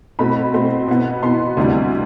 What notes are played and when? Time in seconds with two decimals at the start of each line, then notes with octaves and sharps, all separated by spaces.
0.19 B2 A3 C4 B5
0.54 B2 A3 C4
0.88 B2 B3
1.23 B2 B3 C6
1.57 D2 C3 G3